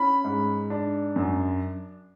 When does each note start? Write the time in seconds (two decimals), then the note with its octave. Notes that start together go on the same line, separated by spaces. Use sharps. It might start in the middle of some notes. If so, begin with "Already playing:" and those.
Already playing: C#4 B5
0.24 G#2
0.70 D4
1.16 F#2